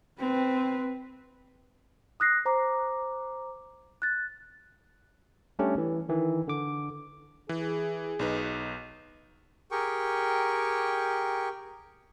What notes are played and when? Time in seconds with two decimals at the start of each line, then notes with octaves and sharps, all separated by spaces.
0.19 C4 B4
2.20 D#6 F#6 A#6 C7
2.45 C5 A#5 D6
4.02 F#6 A6
5.59 G3 A3 C#4 D4 G4
5.78 E3
6.09 D#3 E3
6.48 D3 D6
7.49 E3 G#4
8.19 B1 D#4 B4
9.71 G4 G#4 A#4 G5 C#6